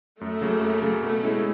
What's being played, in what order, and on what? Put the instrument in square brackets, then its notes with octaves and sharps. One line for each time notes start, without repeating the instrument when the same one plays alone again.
[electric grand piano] F#2 [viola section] A3
[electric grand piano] C#3 F#3 A#3
F#2
C#3 F#3 A#3
[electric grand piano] B2 [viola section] A3
[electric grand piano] G#3 C#4 E4